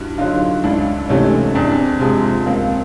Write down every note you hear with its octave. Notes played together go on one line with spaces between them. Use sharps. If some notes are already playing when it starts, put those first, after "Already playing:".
Already playing: G2 E4 F#4
D3 F#3 D#4 F4
C#2 D4 E4
C3 E3 A3 C#4 D#4
E2 C4 D4
C3 F3 G#3
C#2 A#3 C4